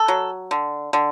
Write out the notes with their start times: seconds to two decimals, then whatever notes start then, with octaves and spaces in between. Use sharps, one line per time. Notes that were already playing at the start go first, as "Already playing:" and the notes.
Already playing: A4
0.08 F#3
0.51 D3
0.93 D3